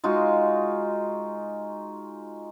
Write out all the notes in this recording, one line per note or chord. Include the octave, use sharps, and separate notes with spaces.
G#3 D#4 F4 F#4